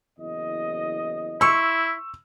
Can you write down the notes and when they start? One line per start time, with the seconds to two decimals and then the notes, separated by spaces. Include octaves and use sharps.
0.18 F#1 E2 D#5
1.41 E4 C6 C#6 E6